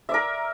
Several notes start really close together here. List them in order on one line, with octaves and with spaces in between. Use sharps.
E5 D5 A#4